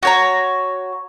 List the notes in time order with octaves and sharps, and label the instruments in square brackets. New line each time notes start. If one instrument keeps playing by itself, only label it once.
[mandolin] F#4 C#5 A#5